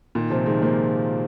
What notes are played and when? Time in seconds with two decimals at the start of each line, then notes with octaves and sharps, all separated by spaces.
0.15 A#2 D#3
0.30 C3 F3
0.46 D#3 G#3
0.62 F3 A#3